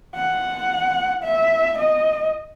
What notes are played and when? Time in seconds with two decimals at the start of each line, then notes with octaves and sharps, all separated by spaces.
0.15 F#5
1.23 E5
1.78 D#5